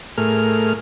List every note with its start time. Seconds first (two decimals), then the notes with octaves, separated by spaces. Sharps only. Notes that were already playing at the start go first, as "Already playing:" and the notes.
0.18 A2 A3 G#4 A#4 F6